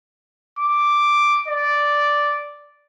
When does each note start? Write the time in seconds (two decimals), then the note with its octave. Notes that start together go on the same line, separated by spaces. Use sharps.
0.59 D6
1.48 D5